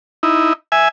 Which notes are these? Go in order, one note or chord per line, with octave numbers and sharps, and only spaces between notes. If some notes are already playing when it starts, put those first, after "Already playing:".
D#4 E4
E5 G#5